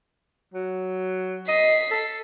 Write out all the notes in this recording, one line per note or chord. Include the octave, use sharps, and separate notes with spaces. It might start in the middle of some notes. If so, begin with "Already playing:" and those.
F#3
D#5 B6 C7
A4